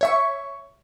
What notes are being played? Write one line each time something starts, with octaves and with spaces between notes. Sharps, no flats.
C#5 E5 C#6